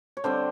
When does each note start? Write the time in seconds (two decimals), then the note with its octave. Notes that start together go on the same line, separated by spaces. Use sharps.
0.17 C#5
0.24 D3 G3 C4 C5